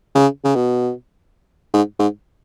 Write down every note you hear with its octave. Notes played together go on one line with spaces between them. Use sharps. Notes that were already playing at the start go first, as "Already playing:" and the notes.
C#3
C#3
B2
G#2
G#2